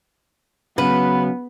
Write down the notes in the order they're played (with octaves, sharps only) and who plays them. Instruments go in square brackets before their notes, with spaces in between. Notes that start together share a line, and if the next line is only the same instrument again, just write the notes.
[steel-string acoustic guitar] C#3 [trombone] F#3 [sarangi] B3 [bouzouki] B4